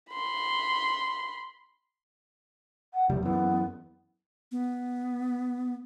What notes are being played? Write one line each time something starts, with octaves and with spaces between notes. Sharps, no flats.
B5 C6
F#5
F1 C#2 G3 A3
F#2 E3 B3
B3